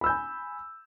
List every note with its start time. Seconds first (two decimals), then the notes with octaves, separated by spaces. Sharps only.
0.01 B5
0.04 E6
0.06 G6
0.09 G#5